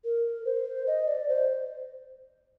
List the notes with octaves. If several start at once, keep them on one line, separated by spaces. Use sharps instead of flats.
A#4
C5
D#5
D5
C5